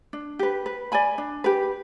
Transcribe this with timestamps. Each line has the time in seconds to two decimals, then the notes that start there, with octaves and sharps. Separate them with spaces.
0.13 D4
0.39 G4 B4
0.66 B4
0.92 D5 G#5 B5
1.18 D4
1.44 G4 B4